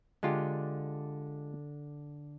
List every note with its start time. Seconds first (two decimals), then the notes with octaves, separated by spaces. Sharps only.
0.23 D3 G#3 F4 G4